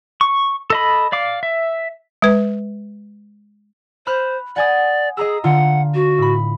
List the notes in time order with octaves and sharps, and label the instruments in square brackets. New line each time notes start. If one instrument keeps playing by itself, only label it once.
[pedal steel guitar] C#6
A4 D#5 B5
D5 F5 D6
E5
[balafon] G#3 B4
[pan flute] C5 [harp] B5 F6 F#6
[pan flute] D5 [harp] F#5 G#5 D#6
[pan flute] G#4 [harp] D#5 A#5 E6
[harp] D3 F4 [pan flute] F#5
[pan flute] F#4
[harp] A2 B5